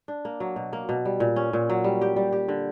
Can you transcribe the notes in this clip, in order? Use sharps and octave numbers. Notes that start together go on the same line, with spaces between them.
D4
A#3
F#3
B2
A#3
B2
G3
A#2
C#4
A#2
F#3
G3
G4
G3
G4
D3